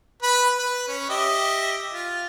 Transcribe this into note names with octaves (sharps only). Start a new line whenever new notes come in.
B4 B5
B4
C#4
G4 D#5 E5
F4